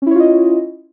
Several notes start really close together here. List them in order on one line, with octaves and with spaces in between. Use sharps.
C#4 E4 C#5 F4 D#5